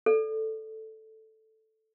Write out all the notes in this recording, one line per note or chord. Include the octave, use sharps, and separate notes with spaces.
A4 D5